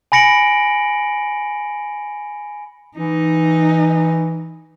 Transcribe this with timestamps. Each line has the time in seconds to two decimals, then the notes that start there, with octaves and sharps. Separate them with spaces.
0.12 G#5 B5 A#6 C#7 D7 F#7
2.97 E3 D#4